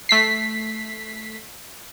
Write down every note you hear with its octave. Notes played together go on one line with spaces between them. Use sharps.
A3 B6 C7